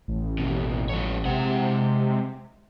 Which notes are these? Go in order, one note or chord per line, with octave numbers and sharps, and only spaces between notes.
A1
D#2 B2
F3 C#5
C3 G#3 F#5